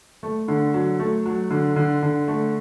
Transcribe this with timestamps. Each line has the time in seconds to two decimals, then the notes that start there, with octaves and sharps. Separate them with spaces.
0.23 A3
0.48 D3
0.74 F#3
0.99 A3
1.26 F#3
1.50 D3
1.76 D3
2.03 D3
2.28 A3